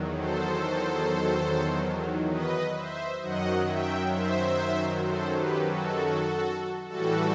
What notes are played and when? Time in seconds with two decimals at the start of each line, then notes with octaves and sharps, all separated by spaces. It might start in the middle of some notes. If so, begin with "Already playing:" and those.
Already playing: E2 D#3 F#3
0.16 A4 C5
2.30 B4 D#5
2.75 C5 E5
3.22 F#2 D#3 F#3 D#5 F#5
3.67 E5 G5
4.13 C5 E5
5.05 A4 C5
5.35 G4 B4
5.66 F#4 A4
6.88 A2 E3 G3 F#4 A4